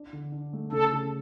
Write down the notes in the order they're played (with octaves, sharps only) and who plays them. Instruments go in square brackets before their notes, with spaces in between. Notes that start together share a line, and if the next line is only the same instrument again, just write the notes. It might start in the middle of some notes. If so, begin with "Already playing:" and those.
Already playing: [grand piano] D4
D3
D4
A3
[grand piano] C#3 [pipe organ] A4
[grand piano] C#3